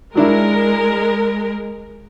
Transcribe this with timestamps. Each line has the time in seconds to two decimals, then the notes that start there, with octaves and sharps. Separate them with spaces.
0.15 F#3 G#3 D4 E4 A#4